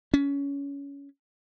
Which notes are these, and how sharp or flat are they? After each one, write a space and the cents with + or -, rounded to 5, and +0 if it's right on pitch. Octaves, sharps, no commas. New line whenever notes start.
C#4 +20